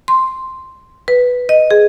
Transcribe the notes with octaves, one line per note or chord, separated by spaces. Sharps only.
C6
B4
D#5
G#4